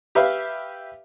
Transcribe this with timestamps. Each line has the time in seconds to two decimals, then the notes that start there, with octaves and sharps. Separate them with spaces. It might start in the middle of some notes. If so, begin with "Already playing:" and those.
0.15 G4 B4 E5 F5